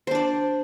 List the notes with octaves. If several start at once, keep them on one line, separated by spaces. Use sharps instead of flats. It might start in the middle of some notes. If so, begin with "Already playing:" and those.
D4 C5 D5